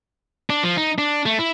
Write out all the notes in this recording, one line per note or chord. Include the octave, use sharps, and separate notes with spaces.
D4
F3
D#4
D4
A3
E4